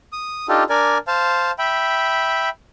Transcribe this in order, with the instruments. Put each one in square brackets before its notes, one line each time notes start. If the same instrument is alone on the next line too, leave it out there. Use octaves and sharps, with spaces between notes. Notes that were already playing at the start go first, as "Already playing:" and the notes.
[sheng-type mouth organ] D#6
D4 D#4 F4 G4 A4
D4 A#4 D5 G#5
C5 F5 A5
E5 G5 B5